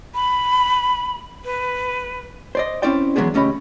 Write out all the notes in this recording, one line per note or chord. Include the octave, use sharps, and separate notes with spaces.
B5
B4
C5 D5 D#5
C4 C#4 E4 C5 D5 G5
E3 F#3 G#3 B3 D4 G#4
C#2 A3 C#4 G4 D#5 B5